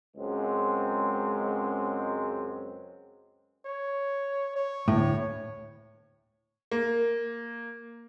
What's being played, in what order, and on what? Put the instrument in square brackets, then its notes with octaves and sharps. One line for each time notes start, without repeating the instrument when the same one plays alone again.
[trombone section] C#2 F#2 G#3 C4
[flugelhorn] C#5
C#5
[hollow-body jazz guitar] D2 A2
[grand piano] A#3